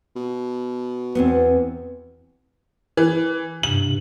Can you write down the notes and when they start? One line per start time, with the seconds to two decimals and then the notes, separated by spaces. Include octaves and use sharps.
0.16 B2
1.15 E2 G#2 B3 C4
2.97 E3
3.63 G2 C3 F#7